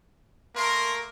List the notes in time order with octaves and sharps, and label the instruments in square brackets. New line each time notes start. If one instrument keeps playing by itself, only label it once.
[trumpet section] A3 A#3 A#4 [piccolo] C6